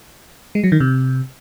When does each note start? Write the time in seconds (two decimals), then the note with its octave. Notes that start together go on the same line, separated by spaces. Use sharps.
0.55 G#3
0.64 F#3
0.72 D#3
0.80 C3